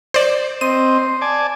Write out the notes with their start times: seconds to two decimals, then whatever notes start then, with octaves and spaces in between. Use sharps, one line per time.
0.14 C5 D5
0.61 C4 C5 D#5 D#7
1.21 D5 G#5 A5